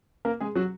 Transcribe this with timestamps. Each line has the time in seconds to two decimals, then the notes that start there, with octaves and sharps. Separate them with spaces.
0.25 A#3 A#4
0.40 G#3 G#4
0.56 F#3 F#4